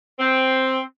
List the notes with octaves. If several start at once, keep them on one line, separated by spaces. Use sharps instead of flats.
C4